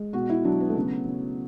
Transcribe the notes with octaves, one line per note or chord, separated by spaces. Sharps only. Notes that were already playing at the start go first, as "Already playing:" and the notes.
Already playing: G#3
B2 F#4
E4
F#3 D4
B3
A3
C#3 B3
C#3